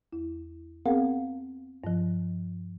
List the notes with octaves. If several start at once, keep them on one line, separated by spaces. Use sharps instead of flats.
E2 E4
B3 C4 G#4 A#4 F5 F#5
G2 F3